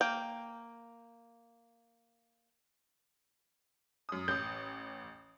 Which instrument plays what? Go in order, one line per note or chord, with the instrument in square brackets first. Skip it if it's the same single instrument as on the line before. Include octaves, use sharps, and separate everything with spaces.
[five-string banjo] A#3 G5
[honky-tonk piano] F#2 D#6
[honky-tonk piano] A1 D#6 [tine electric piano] G6